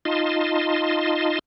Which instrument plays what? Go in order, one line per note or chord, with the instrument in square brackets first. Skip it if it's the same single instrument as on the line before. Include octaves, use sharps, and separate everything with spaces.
[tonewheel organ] D#4 F4 D#5 A5 C6